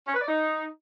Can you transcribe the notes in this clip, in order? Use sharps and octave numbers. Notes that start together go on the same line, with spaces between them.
C#4
B4
D5
D#4